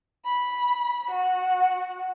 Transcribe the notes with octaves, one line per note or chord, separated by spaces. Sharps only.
B5
F#4 F#5